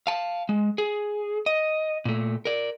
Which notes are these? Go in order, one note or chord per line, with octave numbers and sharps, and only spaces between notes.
F5 A5
G#3
G#4
D#5
A#2 A3
A#4 D5